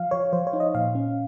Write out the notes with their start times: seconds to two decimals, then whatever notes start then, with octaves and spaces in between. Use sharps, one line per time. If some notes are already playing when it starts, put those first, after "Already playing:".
Already playing: F3 F5
0.11 F3 C#5
0.33 F3 C5
0.47 C#5
0.53 D#4
0.60 D#5
0.75 A#2 F5
0.95 C#4